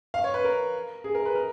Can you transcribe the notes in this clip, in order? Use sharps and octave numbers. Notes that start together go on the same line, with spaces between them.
F5
C#5
B4
A#4
G#4
A#4
B4
A#4